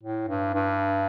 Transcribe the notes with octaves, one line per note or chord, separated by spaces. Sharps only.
A2
G2
G2